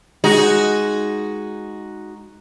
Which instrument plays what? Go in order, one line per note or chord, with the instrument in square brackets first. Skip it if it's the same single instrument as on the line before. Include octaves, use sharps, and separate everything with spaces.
[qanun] G#3 [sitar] D#4 F#4